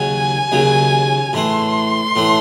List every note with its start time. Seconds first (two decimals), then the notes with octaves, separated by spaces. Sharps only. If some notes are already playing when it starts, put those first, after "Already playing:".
Already playing: D#2 C#3 F#3 G#5
0.52 D#2 C#3 F#3
1.33 A2 E3 A3 C6
2.16 A2 E3 A3